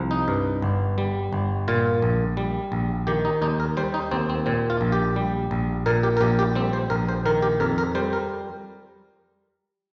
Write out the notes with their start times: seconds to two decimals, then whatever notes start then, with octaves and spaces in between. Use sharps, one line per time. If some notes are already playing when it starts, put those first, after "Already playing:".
Already playing: C2 F3
0.11 D#4
0.28 G2
0.62 G1
0.98 G3
1.33 G1
1.68 A#2 F4
2.02 A#1
2.37 G3
2.72 A#1
3.07 D#3 G4
3.25 D#4
3.42 D#2 D#4
3.60 A#4
3.77 G3 C5
3.94 D#4
4.11 D#2 C4
4.29 C4
4.46 A#2 C4
4.70 F4
4.81 A#1
4.92 G4
5.16 G3
5.51 A#1
5.86 A#2 A#4
6.03 G4
6.17 A#4
6.21 A#1 G4
6.39 G4
6.55 G3 C4
6.73 C5
6.90 A#1 A#4
7.09 C5
7.26 D#3 A#4
7.42 G4
7.60 F2 A#4
7.78 A#4
7.95 G3 C5
8.13 A#4